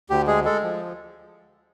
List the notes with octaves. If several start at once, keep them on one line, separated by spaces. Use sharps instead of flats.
D2 G4
G#3 G#4
G#3 A4
F3